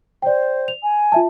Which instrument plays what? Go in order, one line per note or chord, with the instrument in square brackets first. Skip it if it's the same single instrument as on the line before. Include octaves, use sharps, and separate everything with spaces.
[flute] C5 [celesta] D5 G5
[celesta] F7
[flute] G#5
[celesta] F4 E5 A5